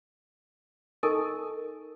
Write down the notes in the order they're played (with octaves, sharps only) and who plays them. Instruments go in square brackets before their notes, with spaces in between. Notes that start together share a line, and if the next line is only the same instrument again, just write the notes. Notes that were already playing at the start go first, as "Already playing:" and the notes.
[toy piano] D#4 A4 A#4 D#5 G#5 C#6